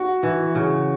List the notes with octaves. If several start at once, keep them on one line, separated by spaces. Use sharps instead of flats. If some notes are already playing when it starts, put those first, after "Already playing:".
Already playing: F#4
E3
C#3